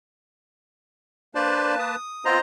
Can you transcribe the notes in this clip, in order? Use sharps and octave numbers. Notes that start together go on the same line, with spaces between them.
A#3 D4 B4 C5 D5 A5
D#6
B3 C4 F4 C5 D#5 A#5